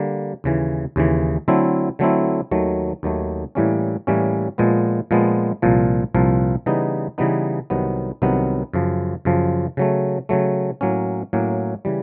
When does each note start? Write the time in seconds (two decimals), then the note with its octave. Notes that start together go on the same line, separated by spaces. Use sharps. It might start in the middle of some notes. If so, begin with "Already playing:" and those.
Already playing: D3 G3 A#3
0.44 D#2 C#3 E3
0.96 D#2 C#3 E3
1.48 D3 F#3 A3 C4 E4
1.99 D3 F#3 A3 C4 E4
2.51 D#2 D#3 F#3 A3
3.03 D#2 D#3 F#3 A3
3.55 A2 E3 G3 A#3 C#4
4.07 A2 E3 G3 A#3 C#4
4.58 A#2 F3 G#3 B3
5.11 A#2 F3 G#3 B3
5.62 C2 A#2 F3
6.14 C2 A#2 F3
6.66 C#3 E3 G3 B3 D#4
7.18 C#3 E3 G3 B3 D#4
7.70 C2 C3 D#3 F#3 B3
8.22 C2 C3 D#3 F#3 B3
8.73 F#2 C#3 F3
9.25 F#2 C#3 F3
9.77 C#3 F#3 A3
10.29 C#3 F#3 A3
10.81 A2 F#3 A#3 C#4
11.33 A2 F#3 A#3 C#4
11.85 C#3 E3 G3